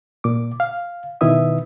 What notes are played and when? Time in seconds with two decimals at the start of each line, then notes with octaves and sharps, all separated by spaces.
0.24 A#2 D6
0.60 F5
1.21 B2 D#3 E4 B4 E5 D#6